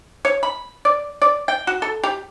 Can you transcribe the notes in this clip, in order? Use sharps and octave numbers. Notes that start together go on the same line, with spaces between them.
C#5
B5
D5
D5
G5
F#4
A4
G4